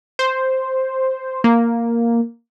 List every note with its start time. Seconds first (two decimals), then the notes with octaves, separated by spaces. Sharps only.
0.19 C5
1.44 A#3